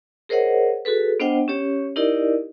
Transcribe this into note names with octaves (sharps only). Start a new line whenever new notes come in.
G#4 A#4 C5 C#5 D#5 F#5
F#4 G#4 A4 B4
B3 D4 C5 D#5 F#5 G5
C#4 G4 C#5
D#4 E4 G4 A#4 D5 D#5